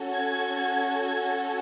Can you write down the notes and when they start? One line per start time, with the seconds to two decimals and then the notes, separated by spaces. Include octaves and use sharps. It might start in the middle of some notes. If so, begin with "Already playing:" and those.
Already playing: C#4 F#4 A4
0.13 G#6
0.98 G#6